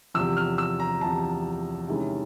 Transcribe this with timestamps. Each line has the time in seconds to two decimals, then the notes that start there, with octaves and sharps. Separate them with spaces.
0.14 E2 C3 F3 E6
0.37 F6
0.58 E6
0.80 A#5
1.01 E2 C3 F3 A5
1.88 C3 D#3 G#3 C#4 E4